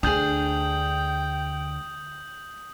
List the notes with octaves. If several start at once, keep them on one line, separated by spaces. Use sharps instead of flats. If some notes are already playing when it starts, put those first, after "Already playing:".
D2 D4 G#4 G5 D#6 G6 F#7